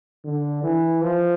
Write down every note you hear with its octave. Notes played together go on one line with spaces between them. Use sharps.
D3
E3
F3